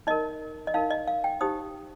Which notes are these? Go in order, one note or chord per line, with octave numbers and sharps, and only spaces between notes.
D#4 A#4 D#5
D#5
D#4 A#4 F5
D#5
F5
G5
D#4 G4 C5 D#6